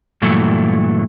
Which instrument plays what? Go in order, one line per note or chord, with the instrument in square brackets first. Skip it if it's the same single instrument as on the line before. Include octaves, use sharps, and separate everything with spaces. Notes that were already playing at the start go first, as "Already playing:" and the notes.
[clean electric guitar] G2 A#2 E3 F#3 A3